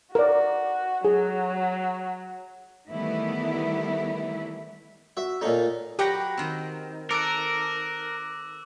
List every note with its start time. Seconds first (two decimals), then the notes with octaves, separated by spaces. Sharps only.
0.15 F#4 A#4 D5
1.05 F#3 G#4
2.89 D#3 E3 G3 A3 B3 E4
5.17 F#4 E5
5.41 A#2 D#4 A4 C#5 D#5
5.99 F#3 G4 B4 F#5 G5 A#6
6.37 D#3 C4
7.11 A4 A#4 D6 E6 F#6 D7